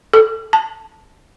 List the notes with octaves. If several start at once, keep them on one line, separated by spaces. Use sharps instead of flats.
A4
A5